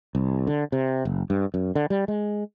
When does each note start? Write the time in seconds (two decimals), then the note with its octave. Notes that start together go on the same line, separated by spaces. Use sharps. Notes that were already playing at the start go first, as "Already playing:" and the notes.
0.15 C2
0.47 D3
0.72 C3
1.05 F#1
1.30 G2
1.54 F#2
1.75 D3
1.90 G3
2.08 G#3